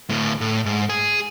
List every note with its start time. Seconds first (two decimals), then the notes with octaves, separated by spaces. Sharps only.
0.09 D2 A2
0.41 A2
0.66 G#2
0.90 G#4